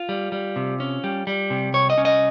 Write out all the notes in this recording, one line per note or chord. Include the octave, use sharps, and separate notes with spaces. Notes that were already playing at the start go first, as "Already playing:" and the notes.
Already playing: F4
G3
G3
C3
C#4
G3
G3
C3
C2 C#5
D#5
C#4
D#5